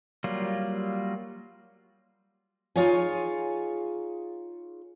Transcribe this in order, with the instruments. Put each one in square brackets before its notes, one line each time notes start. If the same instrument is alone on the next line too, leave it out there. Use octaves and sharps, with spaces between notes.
[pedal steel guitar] F#3 G3 A#3 F4
[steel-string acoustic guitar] D#4 F4 G#4 C#5 F5 G#5